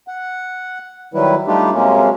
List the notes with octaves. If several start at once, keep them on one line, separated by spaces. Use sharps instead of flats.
F#5
D#3 F#3 G3 E4 B4
G3 A3 D4 D#4 F4 G4
C3 F#3 G#3 A#3 C#4